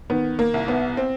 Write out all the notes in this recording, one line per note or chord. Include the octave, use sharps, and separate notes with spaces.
D#3 B3
A#3
C2
B3
C4